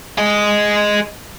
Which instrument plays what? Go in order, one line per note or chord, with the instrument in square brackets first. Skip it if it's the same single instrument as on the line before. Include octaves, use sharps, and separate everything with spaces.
[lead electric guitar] G#4 D#5